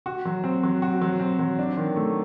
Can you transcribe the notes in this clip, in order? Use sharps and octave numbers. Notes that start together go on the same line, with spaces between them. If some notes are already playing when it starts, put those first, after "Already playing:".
F#4
F#3
C4
F#3
F#4
F#3
C4
F#3
D4
D#3
A3